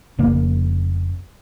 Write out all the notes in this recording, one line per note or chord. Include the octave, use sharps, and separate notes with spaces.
F1 C#3 A#3